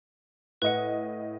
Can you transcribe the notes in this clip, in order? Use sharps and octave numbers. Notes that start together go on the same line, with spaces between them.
A2 B4 D#5 F#5